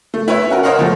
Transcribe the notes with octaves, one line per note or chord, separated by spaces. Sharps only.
A3
E4 B4 C#5 E5
C#4 F#4 A#4
A#4 C5 C#5 D#5 F5 F#5
E3 F3 A3